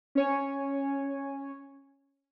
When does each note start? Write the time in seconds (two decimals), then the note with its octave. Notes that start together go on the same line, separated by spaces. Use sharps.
0.15 C#4 C#5 G#5